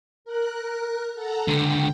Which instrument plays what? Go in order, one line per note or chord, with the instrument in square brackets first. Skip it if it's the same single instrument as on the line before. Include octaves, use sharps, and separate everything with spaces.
[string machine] A#4 F#6
A4 F#5 A#5
[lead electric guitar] C#2 D3 [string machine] G5